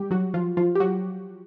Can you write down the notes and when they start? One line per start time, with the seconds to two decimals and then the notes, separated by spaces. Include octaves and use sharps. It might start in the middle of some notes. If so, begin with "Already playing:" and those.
Already playing: G3 G4
0.11 F#3 F#4
0.34 F3 F4
0.57 F3 F4
0.75 G4
0.80 F#3 F#4